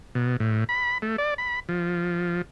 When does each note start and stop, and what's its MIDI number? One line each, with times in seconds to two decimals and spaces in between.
0.15 0.36 47
0.40 0.64 45
0.69 0.98 83
1.02 1.16 57
1.18 1.34 74
1.38 1.60 83
1.69 2.42 53